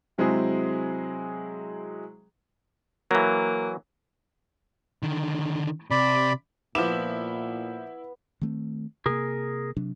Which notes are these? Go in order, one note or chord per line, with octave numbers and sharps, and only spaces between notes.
C3 F#3 G#3 C4 E4 G#4
E3 F#3 A#3
D3 D#3
C3 D5 B5
A#2 F3 B3 E4 D6 E7
D#3 A3 C4
C3 A#3 G#4 A#4
C3 F#3 D4